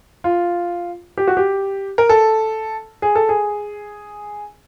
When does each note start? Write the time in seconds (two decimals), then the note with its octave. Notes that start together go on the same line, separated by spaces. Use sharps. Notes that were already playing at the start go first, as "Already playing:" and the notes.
0.24 F4
1.18 G4
1.27 F#4
1.37 G4
1.98 A#4
2.09 A4
3.02 G#4
3.15 A4
3.29 G#4